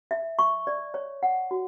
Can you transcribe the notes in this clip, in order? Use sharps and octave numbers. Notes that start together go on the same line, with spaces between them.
E5
C#6
D5
C#5
F#5
F#4